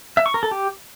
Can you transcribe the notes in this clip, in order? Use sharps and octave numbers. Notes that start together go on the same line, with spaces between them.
E5
C#6
A#4
A4
G4